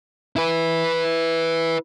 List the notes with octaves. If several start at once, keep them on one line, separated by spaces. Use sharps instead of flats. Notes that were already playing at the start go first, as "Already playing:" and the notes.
E4 B4